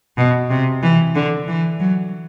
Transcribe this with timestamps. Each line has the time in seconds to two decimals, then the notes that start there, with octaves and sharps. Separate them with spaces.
0.17 B2
0.50 C3
0.83 E3
1.15 D3
1.48 E3
1.80 F#3